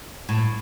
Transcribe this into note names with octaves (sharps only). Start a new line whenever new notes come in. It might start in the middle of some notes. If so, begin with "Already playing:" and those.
A2